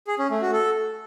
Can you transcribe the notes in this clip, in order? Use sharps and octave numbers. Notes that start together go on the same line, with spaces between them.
G#4
C#4
A3
F#4
A4